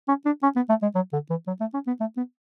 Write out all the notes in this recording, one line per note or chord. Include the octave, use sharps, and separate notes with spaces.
C#4
D4
C#4
B3
A3
G#3
F#3
D3
E3
F#3
A3
C#4
B3
A3
B3